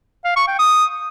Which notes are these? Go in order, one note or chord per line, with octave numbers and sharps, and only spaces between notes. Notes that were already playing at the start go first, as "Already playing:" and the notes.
F5
C#6
G5
D#6